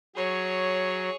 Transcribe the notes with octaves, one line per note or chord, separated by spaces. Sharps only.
F#3 G#4 C#5